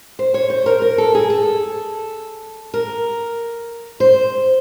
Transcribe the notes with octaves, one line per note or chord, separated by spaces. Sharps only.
C5
C#5
C5
A#4
A#4
A4
G#4
A4
A#4
C5